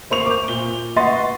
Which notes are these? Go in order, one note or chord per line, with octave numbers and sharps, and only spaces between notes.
A#3 C5 C#6 F7
D6 G6
A#2 G7
B4 D#5 F#5 C6 C#6 A6